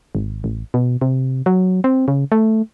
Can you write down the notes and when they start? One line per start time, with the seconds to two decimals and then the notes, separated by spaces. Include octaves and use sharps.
0.15 G#1
0.44 A1
0.74 B2
1.01 C3
1.46 F#3
1.84 C4
2.08 C#3
2.32 A3